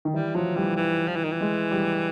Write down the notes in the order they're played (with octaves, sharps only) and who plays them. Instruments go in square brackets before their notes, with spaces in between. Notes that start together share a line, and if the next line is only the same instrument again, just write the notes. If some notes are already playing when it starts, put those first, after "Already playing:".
[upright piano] D#3
[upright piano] E3 [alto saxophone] G3
[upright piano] F3 [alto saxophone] F#3
[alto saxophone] E3 [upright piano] G3
[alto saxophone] E3
F3
E3
D#3
E3
[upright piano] G#3
G3